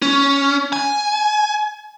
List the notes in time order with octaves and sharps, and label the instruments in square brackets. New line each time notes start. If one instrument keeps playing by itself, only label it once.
[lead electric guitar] C#4
G#5